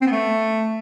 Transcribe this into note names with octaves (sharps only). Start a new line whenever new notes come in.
C4
B3
A3